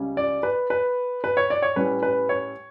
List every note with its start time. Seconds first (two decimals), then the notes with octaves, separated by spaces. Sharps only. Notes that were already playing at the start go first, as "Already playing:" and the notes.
Already playing: C#2 C#3 G3 C#4
0.17 D5
0.43 B4
0.70 B4
1.24 B4
1.37 C#5
1.50 D5
1.62 C#5
1.76 A2 G3 C#4 B4
2.03 B4
2.29 C#5